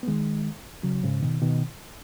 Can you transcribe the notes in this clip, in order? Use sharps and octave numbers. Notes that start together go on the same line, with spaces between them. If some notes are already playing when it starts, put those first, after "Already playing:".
B3
D#3 G#3
C#3 F#3
G#2 C#3
B2 D#3
B2 D#3